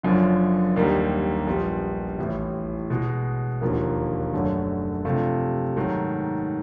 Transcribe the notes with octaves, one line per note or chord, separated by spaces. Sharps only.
F#1 F#2 D3 F3
D#2 D3 G3 A#3 D#4
A#1 A#2 G3 B3
A1 A2 E3
B2 G#3 B3
E1 D#2 D3 F3 A#3
F#1 F#2 D3 F#3 A3
C3 F3 A3 D4 F4
G#2 D#3 F#3 A3